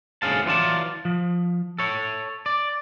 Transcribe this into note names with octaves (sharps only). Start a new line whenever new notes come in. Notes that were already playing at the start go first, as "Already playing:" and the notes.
D2 G#2 C#4 G#4 F5 A5
E3 F#3 F4 D5 A5
F3
A4 C#5
D5